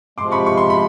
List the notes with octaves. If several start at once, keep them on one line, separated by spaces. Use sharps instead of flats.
C3 F3 G#3 C6 D6
B5 C#6
C#6
C6
B5